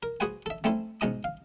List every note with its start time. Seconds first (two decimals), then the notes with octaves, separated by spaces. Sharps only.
0.03 A#4
0.20 F#4 G#4 B4 C5 F#5 G#5
0.46 A4 E5
0.64 A3 C4 C#4 E4 A4 C5
1.01 G#2 B2 C#4 D#4 A#5 D#6
1.24 F5